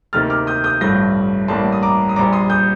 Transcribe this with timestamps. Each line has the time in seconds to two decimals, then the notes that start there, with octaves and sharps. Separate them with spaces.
0.13 D2 C3 D#3 A#3 F6 A6
0.30 D6 F6
0.47 D#6 G6
0.64 D#6 G6
0.81 A1 G2 F3 A3 G6 A#6
1.48 A1 A2 G3 A#3 A5 C6
1.72 D#6
1.83 A#5 D6
2.09 D#6
2.16 A#1 A#2 G3 A#5 D6
2.33 C6 D#6
2.50 D#6 G6